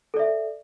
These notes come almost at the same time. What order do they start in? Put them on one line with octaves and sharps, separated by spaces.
A4 D5 E5